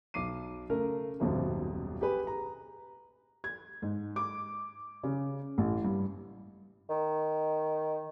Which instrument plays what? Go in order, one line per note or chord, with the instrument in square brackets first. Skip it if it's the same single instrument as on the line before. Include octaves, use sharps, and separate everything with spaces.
[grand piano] B1 D6 C7 D#7
C#3 A3 A#4
D#1 G#1 F#2 B2 F3
G4 G#4 B4
A#5
[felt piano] G#6
G#2
D6
C#3
A1
G2
[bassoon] D#3